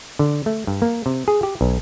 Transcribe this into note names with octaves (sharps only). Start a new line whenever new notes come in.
D3
A3
G2
A#3
C3
G#4
G4
B1